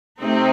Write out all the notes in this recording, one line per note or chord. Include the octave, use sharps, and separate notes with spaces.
C3 A3 C4 D#4